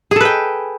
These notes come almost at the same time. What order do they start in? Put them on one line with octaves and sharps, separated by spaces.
G#4 A4 B4 G5